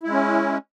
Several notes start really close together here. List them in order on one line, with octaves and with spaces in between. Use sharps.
E4 G#3 C#4